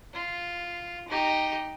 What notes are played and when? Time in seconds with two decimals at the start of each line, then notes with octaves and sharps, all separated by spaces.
0.14 F4
1.08 D#4 G4